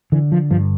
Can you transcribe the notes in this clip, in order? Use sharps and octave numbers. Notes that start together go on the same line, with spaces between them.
D3 E3
F3
G2 F3